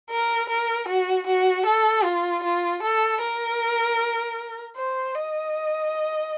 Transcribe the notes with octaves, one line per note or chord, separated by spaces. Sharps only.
A#4
A#4
F#4
F#4
A4
F4
F4
A4
A#4
C5
D#5